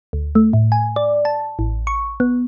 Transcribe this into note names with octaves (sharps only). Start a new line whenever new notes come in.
D2
A3
A2
G#5
D5
A5
A1
C#6
B3